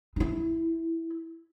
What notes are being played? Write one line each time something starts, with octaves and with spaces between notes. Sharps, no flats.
D#4 E4